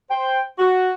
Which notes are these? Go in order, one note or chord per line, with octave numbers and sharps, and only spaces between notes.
C5 G5
F#4